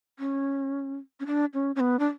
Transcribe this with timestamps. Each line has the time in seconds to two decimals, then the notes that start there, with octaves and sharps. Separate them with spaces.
0.19 C#4
1.20 C#4
1.26 D4
1.54 C#4
1.76 C#4
1.80 B3
1.99 D4